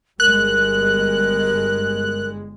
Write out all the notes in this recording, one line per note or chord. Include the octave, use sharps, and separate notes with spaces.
G1 G3 G#3 A#4 F#6